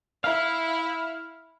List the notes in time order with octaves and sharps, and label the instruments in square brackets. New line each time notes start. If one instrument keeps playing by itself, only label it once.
[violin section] E4 [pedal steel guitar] F5